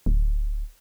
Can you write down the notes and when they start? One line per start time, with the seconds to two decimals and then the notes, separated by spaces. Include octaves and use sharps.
0.06 D1